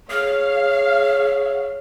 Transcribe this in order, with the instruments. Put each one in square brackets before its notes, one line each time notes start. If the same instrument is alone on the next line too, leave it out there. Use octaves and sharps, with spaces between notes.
[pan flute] G#4 [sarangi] C#5 [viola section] F5